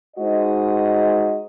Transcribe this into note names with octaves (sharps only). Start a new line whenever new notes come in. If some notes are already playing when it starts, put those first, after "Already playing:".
G#3 D#4 F#4 C5 D#5